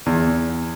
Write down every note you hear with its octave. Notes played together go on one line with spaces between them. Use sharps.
E2